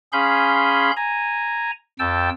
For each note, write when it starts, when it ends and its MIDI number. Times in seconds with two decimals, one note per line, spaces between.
0.13 0.91 61
0.13 0.91 68
0.13 0.91 77
0.13 0.91 83
0.13 0.91 84
0.13 0.91 91
0.96 1.71 80
0.96 1.71 82
1.99 2.30 41
1.99 2.30 79
1.99 2.30 81
1.99 2.30 88